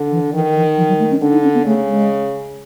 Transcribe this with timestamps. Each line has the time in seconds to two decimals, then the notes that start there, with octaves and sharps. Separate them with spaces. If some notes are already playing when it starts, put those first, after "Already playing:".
Already playing: D3
0.11 E3
0.33 D#3 E3
0.56 E3
0.77 F3
0.88 F#3
0.99 A3
1.11 C#4
1.21 D3 D4
1.32 D#4
1.43 C#4
1.54 B3
1.66 C#3 A3
1.88 G#3